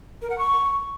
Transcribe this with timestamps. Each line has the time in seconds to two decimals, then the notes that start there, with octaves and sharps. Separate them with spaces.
0.22 A#4
0.30 F#5
0.38 C#6